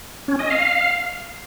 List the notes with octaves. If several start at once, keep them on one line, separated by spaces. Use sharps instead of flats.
C#4
D#5
F5